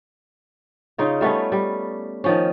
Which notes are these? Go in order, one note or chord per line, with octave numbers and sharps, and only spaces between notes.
C#3 D#4 F4
G3 A3 B3 C#4
G3
D#3 F3 C#4